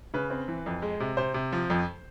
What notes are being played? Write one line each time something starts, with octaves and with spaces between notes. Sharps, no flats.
C#3 B4
C4
E3
F2
G#3
C3
C3 C5
C3
F3
F2